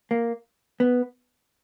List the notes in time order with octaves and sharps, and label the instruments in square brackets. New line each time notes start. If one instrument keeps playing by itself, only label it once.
[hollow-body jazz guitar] A#3
B3